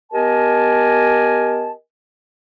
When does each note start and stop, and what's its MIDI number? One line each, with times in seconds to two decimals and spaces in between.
0.12 1.72 59
0.12 1.72 67
0.12 1.72 70
0.12 1.72 75
0.12 1.72 80
0.12 1.72 81